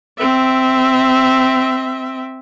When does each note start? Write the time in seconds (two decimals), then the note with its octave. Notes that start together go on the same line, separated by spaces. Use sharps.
0.18 C4 E5